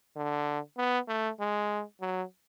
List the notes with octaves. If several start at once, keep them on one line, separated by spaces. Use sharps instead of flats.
D3
B3
A3
G#3
F#3